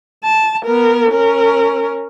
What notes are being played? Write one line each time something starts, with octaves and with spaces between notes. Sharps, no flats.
A5
B3 A#4
C#4 A#4